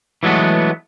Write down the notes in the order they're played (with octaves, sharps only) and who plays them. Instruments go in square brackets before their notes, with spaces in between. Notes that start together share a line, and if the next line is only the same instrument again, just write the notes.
[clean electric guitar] E3 F#3 G#3 A3 B3